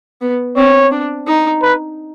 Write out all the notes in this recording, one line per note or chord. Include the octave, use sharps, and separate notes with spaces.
B3
C4 C#5
D4
D#4
B4